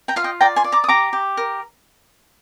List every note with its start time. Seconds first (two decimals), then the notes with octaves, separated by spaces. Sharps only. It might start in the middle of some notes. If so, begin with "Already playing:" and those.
0.08 G5 A#5
0.16 F4 F5
0.24 D#5 G5
0.40 D5 G5 A#5
0.56 G#5 C6
0.64 D5
0.72 A#5 D6
0.84 D#6
0.88 G4 A#5 D6
1.13 G4
1.37 A#4